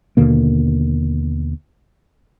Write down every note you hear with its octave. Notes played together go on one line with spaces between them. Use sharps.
D#2 B2 D3 A#3